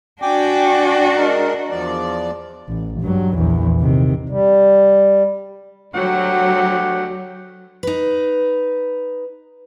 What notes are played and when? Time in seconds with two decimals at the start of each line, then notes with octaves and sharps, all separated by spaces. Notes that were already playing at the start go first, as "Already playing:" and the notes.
0.22 D4 F#4 G5 G#5 D6
1.16 G#3 A#4
1.71 E2 F3 D5
2.69 A1
3.02 G2 F#3
3.38 A#1 E2
3.81 C3 D#3
4.29 G3
5.95 D2 F#3 G4 F#5
7.83 D#4 B4